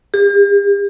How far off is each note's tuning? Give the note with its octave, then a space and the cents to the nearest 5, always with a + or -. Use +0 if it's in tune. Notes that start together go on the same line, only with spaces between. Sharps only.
G4 +45